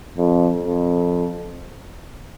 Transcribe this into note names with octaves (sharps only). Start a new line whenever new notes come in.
F2
F2